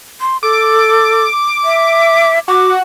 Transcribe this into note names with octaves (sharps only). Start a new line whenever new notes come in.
C6
A4 D6
E5
F#4 D6